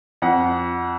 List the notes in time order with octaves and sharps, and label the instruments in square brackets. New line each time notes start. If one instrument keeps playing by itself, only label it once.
[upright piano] F2 F#5